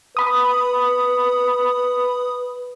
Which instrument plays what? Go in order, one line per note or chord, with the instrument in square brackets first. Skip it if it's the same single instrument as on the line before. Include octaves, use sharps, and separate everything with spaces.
[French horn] B4 [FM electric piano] B5 D#6